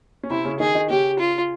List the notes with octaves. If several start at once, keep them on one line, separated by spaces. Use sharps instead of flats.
C#4
C3 C4 E4
C#3 C#4
D#3 D#4 G#4
D#3 D#4
C#3 C#4 G4
F4